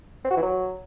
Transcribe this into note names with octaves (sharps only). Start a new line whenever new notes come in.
C4
F#4
E3
F#3